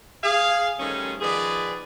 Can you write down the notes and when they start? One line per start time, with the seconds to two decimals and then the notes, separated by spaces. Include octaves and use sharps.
0.23 G#4 F5
0.78 D#3 G3 A3 C#4 G#4 C5
1.21 D#3 F3 B3 G#4 B4 D5